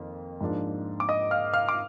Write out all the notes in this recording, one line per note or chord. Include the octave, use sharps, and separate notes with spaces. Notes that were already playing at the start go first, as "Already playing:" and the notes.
Already playing: F2 D#3 A#3
G#2 F3 A#3 D4
D6
D#5 D#6
F5 F6
F5 F6
D6